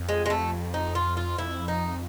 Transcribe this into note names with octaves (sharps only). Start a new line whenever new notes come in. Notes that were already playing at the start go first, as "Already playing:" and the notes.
Already playing: F2
G#3
G#3
A3
D#4
F4
F4
F2 E4
D#4